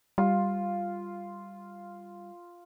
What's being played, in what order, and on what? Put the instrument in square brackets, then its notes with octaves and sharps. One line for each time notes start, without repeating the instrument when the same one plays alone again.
[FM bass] G3 [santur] F4